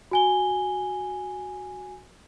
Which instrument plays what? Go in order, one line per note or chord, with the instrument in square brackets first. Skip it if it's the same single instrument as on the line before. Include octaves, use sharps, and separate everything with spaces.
[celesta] F#4 G#5 G7